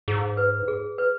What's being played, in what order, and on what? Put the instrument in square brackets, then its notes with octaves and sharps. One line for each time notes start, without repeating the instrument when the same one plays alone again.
[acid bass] G#2 [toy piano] G#4
[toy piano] B4
G#4
B4